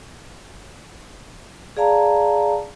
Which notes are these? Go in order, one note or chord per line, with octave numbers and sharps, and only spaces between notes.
G#4 D5 F5 A5 A#5